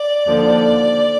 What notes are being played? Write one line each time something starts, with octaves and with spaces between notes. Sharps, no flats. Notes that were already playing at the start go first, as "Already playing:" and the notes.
Already playing: D5
D#2 D3 F3